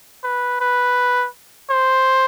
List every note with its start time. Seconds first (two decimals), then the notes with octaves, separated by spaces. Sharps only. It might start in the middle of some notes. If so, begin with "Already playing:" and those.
0.24 B4
0.61 B4
1.70 C5